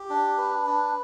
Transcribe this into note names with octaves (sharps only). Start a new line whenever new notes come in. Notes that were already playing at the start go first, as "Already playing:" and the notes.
Already playing: G4
D4
B4
D4